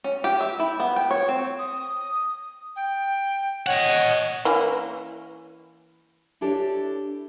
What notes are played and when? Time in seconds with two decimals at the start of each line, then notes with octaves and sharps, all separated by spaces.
0.04 C#4
0.24 G4
0.41 E5
0.60 E4
0.80 B3
0.96 G5
1.11 C#5
1.29 C4
1.59 D#6
2.76 G5
3.67 C#5 D#5 F#5
4.45 E3 A#3 C#4
6.41 D4 E4 G4 A4 C#5 D5